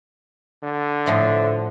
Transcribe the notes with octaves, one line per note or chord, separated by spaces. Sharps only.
D3
A2 F3 D#5 E5